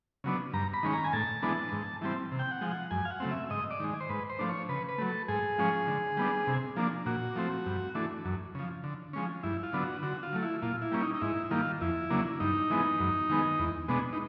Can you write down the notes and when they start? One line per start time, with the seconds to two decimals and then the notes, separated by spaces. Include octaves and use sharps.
0.24 C#3 F#3 B3 D4
0.53 G2 A#5
0.74 B5
0.83 D#3 G#3 C#4
0.93 A#5
1.04 G#5
1.13 A2 A5
1.42 E3 G#3 B3 D4
1.72 G#2
2.01 E3 G3 C4
2.32 C3
2.39 G5
2.52 F#5
2.61 F3 G#3
2.71 F#5
2.91 F#2 G#5
3.05 F5
3.11 F#5
3.20 C#3 F#3 A3 C4
3.31 E5
3.50 G#2 D#5
3.71 D5
3.80 D#3 G#3
4.00 C5
4.10 G#2 B4
4.30 C5
4.39 F3 A3 D4
4.49 C#5
4.69 C#3 B4
4.89 B4
4.98 F#3 A3
5.09 A4
5.28 G#2 G#4
5.58 F3 G#3 C#4
5.87 D3
6.17 G3 B3 D4
6.47 C3
6.76 F3 A#3 D4
7.06 A#2 F#4
7.36 F3 A3 C4
7.66 G2
7.95 E3 A3 D4
8.25 F#2
8.55 C#3 F3
8.84 D3
9.13 F3 G#3 C#4
9.43 G2 E4
9.63 F4
9.73 D3 F#3 B3 D4
9.83 F#4
10.03 D3 F#4
10.23 F4
10.33 F#3 A3
10.43 E4
10.62 A#2 F4
10.82 E4
10.92 G3 A#3 C#4
11.02 D#4
11.14 D#4
11.21 G#2 E4
11.51 D#3 G3 A#3 F4
11.81 F2 E4
12.10 C#3 F#3 A#3 D4
12.40 G2 D#4
12.70 E3 G#3 B3
13.00 F#2
13.29 D#3 G#3 B3
13.59 E2
13.88 B2 G#3 B3 D4
14.13 D#4